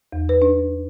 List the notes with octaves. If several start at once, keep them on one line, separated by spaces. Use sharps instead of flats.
E2
B4
D4